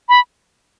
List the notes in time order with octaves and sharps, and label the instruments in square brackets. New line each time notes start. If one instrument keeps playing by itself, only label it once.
[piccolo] B5